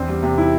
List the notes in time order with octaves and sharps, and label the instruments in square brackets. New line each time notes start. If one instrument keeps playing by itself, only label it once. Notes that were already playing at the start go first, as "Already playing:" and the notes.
Already playing: [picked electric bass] E2 [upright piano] C4 D4
[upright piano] G3
C3
E4